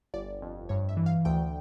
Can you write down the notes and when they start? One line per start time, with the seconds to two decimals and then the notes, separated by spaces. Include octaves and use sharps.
0.14 G1 D5
0.42 F2
0.69 G2 C#5
0.89 E5
0.97 E3
1.06 F5
1.25 D2 G5